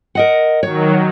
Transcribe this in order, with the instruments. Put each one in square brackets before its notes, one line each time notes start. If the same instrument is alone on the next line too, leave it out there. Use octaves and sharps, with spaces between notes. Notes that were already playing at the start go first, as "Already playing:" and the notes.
[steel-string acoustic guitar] A#4 D#5 F#5
[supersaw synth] D#3 F#3 [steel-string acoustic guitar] C#5